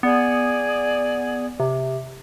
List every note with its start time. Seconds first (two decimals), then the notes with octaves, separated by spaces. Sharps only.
0.03 B3 G#4 D5
1.60 C3